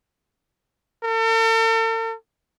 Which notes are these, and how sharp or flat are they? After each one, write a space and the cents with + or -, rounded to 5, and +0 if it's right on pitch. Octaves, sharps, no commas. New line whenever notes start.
A4 +45